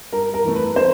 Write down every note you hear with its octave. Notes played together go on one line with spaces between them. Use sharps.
G2 A#4
A#4
E3 A3
B4
C5